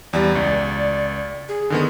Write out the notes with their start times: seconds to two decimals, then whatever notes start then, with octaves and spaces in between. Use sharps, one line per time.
0.13 E2 G3 D5
0.35 C#2
1.49 G#4
1.70 D3 D#3 B3